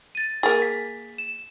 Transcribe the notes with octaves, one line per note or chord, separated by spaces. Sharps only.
A6 D#7
A#3 G#4 A6
B6
E7